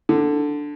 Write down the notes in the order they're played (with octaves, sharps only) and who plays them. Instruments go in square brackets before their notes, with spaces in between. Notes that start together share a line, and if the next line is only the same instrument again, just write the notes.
[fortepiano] D3